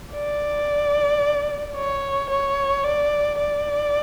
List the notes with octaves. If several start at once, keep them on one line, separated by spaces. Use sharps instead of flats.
D5
C#5
C#5
D5
D5